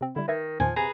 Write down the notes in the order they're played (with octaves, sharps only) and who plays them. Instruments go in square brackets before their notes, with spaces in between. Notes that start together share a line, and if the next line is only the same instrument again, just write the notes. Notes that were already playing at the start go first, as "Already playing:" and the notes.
[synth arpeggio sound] C3 C4
[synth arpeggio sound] D3 G3 [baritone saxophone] E4
[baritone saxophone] D#3 [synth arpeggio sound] B4 E5 G#6
[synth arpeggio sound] E2 A#2 D#3 [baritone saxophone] F3 [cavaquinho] G#5
[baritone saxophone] C3 [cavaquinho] G#4 B4 A#5